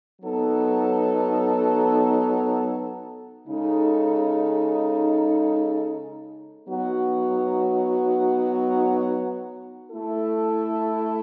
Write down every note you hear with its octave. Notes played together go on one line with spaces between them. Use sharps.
F#3 B3 D#4 A4
C#3 G#3 D#4 A4
F#3 B3 D#4 F#4
A3 E4 A4